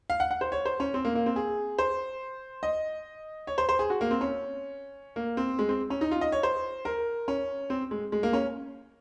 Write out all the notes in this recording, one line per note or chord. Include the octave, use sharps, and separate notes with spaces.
F5
F#5
F#5
C5
C#5
C5
C#4
C4
A#3
A#3
C4
G#4
C5
D#5
C#5
C5
C5
G#4
F#4
A#3
C4
C#4
A#3
C4
G#3
C4
C#4
D#4
F4
D#5
C#5
C5
A#4
C#4
C4
G#3
G#3
A#3
C#4